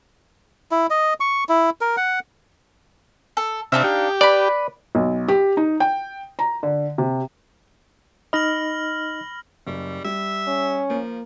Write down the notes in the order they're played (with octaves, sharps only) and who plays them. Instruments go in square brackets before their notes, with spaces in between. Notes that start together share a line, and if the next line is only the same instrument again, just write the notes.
[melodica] E4
D#5
C#6
E4
A#4
F#5
[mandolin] A4
[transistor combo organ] C3 E5 [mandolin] D4 D#4 F5
[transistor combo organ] G4
[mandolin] B4 B5 [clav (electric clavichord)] D5
[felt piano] B1
G4
D#4
G5
A#5
D3
C3
[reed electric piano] D#4 D#5 [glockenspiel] B5 A#6 [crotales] F6 F#7
[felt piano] F#1 [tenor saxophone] G3
[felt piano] G3 [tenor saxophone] E5
[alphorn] C#4
[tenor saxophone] F3 [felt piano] A#3